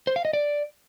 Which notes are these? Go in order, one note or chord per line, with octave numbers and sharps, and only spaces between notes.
C5
F5
D#5
D5